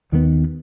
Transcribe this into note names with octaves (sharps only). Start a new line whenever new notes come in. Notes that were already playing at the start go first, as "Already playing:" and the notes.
D#2 D#3 F#3 B3